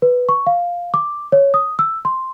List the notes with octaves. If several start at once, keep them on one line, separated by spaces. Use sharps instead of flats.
B4
C#6
F5
D6
C#5
D#6
E6
C6